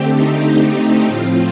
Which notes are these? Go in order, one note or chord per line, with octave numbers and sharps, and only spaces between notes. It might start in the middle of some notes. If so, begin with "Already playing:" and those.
Already playing: D3 A3 C4 G4
D#4
A2 F3 C4 F4